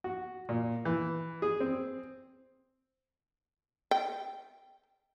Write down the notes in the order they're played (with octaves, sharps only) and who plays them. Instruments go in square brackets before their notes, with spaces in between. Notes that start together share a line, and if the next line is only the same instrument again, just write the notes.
[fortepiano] F#4
A#2
E3
G#4
C4
[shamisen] G5